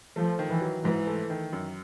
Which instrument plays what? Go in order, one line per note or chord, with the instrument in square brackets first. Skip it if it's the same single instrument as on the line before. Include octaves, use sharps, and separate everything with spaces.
[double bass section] F3 [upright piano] A3
[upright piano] D#3
[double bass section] E3
[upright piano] F#3
[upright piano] G#2 [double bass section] E3
[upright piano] A3
D#3
F#2